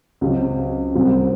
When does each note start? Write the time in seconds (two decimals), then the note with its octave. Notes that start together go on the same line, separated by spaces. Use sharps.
0.21 C#2 C#3 F#3 C4
0.95 C2 C3 F#3 C4